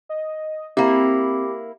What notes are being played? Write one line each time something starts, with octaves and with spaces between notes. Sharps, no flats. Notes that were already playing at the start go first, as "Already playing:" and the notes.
D#5
A#3 C4 E4 G4